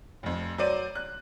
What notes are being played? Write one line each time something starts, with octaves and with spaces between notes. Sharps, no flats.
F1 F2
F#3 C5 D5 D#7
F#6